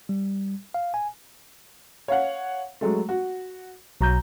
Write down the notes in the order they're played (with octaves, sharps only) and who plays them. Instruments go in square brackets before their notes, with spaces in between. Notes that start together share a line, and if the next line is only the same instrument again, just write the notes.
[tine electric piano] G3
F5
G#5
[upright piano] C#5 F5 F#5
F#3 G#3 A3
F#4
[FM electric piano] B1 A#5 G6 [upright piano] F#3